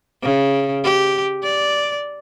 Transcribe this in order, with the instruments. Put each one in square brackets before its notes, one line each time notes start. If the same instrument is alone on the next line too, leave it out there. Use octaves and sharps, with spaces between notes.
[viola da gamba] C#3
G4
D5